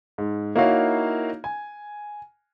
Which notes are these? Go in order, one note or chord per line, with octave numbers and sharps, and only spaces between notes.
G#2
A#3 D#4 E4 F#4 C#5 F5
G#5